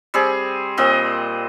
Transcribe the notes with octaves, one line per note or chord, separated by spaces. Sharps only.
G3 C4 G#4
A#2 C4 D#5